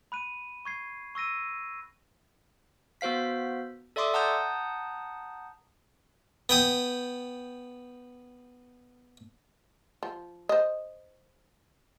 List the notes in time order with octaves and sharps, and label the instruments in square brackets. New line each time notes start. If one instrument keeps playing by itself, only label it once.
[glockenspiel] B5 F#6 D#7
C#6 G#6 C7
C#6 E6 A#6 D#7
[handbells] B3 F#4 C5 F5 B6
A4 D5 E5 C6 D6 D#6
F#5 A5 A#5 D#6 G6
[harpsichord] B3 G5 D#6
[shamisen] F3
C5 D#5